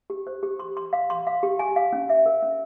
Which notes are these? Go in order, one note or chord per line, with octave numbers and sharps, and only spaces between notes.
G4
C5
G4
C6
C6
F5
C6
F5
G4
G#5
F5
C#4
E5
A#4
C#4